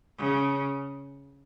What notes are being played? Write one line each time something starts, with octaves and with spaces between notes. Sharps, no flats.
C#3